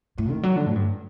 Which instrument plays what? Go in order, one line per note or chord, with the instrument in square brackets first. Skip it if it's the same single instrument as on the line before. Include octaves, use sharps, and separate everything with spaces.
[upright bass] A2
D#3
F#3
D3
A2
G2